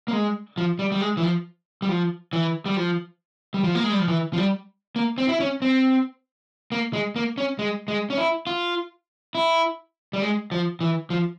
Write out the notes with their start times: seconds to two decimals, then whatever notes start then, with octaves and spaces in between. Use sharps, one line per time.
0.08 A#3
0.13 G#3
0.58 F3
0.79 G3
0.92 G3
1.01 G#3
1.17 E3
1.23 F3
1.82 G3
1.89 F3
2.33 E3
2.66 G3
2.77 F3
3.54 G3
3.64 F3
3.75 A#3
3.84 G#3
3.92 G3
3.99 F3
4.08 E3
4.33 F3
4.38 G3
4.96 A#3
5.18 C4
5.29 E4
5.40 C#4
5.62 C4
6.72 A#3
6.93 G#3
7.16 A#3
7.38 C#4
7.59 G#3
7.88 G#3
8.10 C#4
8.17 E4
8.47 F4
9.35 E4
10.13 G3
10.22 G#3
10.52 F3
10.81 E3
11.10 F3